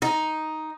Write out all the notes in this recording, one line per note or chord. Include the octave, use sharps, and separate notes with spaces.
D#4